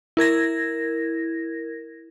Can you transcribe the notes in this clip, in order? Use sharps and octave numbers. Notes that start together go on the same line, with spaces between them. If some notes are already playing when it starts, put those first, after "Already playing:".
E4 A#4 G#6 A#6